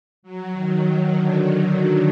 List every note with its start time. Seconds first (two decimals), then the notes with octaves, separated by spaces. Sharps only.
0.23 F#3
0.52 D#3
0.81 D#3
1.09 D3